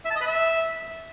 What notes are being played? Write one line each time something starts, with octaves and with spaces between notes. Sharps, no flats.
E5
A5
D#5
B4
E5